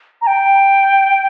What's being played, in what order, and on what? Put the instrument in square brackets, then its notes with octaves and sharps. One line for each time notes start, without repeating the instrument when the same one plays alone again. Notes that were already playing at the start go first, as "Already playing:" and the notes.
[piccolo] A#5
G5